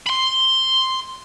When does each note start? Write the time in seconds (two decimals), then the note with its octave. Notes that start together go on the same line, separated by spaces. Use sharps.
0.07 B5 C6